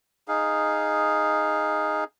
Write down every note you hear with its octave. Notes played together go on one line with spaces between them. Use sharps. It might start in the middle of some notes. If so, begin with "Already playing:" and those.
D#4 G#4 F5